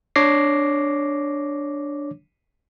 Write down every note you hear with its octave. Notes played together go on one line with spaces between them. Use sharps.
D4 C#5 D6 A#6 C7